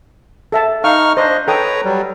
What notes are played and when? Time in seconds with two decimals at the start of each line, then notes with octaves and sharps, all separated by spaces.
0.52 A4 E5 A5
0.84 D#4 F5 C#6 F6
1.17 D4 C5 D#5
1.48 A4 B4 C#5 G5 A#5 D#6
1.84 F#3 G3